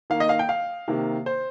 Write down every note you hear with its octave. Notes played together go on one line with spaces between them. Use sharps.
D#3 A#3 F5
D#5
F5
G5
F5
C3 D#3 A#3
C5